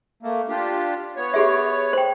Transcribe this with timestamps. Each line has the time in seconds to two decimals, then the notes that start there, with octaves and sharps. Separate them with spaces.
0.23 A3 A#3
0.49 D4 F4 G4
1.16 B3 C#5
1.34 G4 G#4 E5
1.93 C5 G5